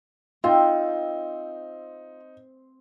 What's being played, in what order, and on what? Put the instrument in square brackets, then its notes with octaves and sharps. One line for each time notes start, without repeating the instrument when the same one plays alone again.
[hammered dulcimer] C4 [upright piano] D#4 [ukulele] F4